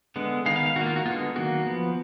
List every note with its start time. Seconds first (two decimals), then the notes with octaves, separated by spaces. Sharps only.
0.16 D3 G#3 B3
0.46 D#3 G#3 B3 F5
0.56 F5
0.66 F5
0.76 D#3 F#4
0.81 A#3
0.86 F4
0.96 F#4
1.06 D3 G#3 B3 F4
1.36 D#3 F#3 A#3 F#4
1.66 F3 B3